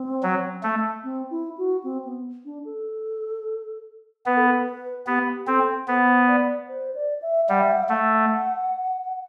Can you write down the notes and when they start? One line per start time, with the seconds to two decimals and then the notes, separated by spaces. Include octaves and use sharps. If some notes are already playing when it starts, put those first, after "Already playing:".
Already playing: C4
0.23 F#3
0.63 A3
1.04 C4
1.30 E4
1.58 F#4
1.84 C4
2.05 B3
2.45 D4
2.65 A4
4.26 B3 B4
4.37 A4
4.47 B4
5.07 B3 G4
5.47 C4 A4
5.88 B3 C5
6.28 D5
6.68 C5
6.95 D5
7.22 E5
7.49 G3 F#5
7.60 E5
7.71 F#5
7.83 E5
7.89 A3 F#5